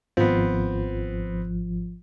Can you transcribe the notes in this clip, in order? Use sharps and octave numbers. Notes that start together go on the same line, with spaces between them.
G#1 F3 B3 C4